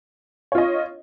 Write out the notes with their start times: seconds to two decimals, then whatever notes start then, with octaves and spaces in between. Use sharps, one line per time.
0.52 C#5
0.55 F4
0.58 D#5